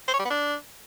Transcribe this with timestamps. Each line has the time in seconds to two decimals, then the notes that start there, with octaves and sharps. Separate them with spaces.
0.08 C5
0.14 C#5
0.19 G3
0.25 B3
0.30 D4